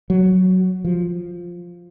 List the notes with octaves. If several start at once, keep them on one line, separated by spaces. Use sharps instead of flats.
F#3
F3